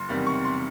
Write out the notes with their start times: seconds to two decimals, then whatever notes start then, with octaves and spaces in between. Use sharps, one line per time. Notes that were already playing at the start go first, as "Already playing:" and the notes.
Already playing: F#1 C6
0.09 E2 C3 D#3 G3
0.27 C#6
0.45 C6